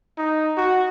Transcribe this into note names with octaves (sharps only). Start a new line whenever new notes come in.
D#4
F#4